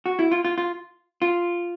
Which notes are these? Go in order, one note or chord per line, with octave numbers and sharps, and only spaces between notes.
F#4
E4
F4
F4
F4
F4